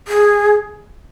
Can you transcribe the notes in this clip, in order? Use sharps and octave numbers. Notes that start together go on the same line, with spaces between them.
G#4